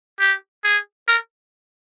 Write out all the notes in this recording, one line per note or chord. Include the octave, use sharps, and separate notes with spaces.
G4
G#4
A#4